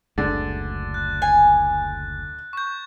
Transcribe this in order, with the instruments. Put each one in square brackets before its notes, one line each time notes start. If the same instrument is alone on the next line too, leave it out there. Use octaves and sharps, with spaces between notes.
[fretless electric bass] F#1 D2 G#3 [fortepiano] D3 [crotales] A6
[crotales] F#6
[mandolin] G#5
[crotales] C#6 G6